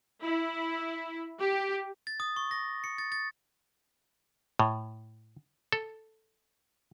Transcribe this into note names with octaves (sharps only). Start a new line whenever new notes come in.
E4
G4
A6
D#6
C#6
A#6
C#7
A6
A6
A2
A4